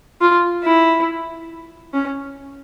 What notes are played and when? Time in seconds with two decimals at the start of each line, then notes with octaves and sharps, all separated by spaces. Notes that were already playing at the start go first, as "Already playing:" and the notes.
0.21 F4
0.64 E4
1.94 C#4